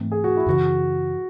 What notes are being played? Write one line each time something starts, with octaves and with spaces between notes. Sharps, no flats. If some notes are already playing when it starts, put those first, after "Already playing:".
Already playing: G#2 E3 A3 C4
G#4
F#4
E4
F#2 C#3 E3 F#4